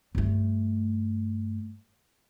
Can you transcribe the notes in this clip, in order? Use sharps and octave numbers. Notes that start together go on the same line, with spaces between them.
G2 A3